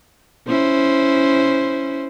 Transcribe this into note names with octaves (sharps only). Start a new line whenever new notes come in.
C#4 E4 C5